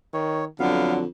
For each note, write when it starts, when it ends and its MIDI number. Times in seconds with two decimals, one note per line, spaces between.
0.14 0.46 51
0.14 0.45 73
0.60 1.06 41
0.60 1.03 50
0.60 1.00 54
0.60 0.94 59
0.60 0.94 77